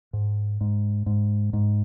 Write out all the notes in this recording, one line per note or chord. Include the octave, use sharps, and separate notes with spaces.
G#2
G#2
G#2
G#2